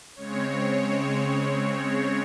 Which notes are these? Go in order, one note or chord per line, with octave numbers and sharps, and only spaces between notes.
C#3 G#3 C4 C#5
C#5